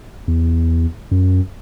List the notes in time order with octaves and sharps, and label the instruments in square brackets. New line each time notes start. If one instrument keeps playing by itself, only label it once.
[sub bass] E2
F#2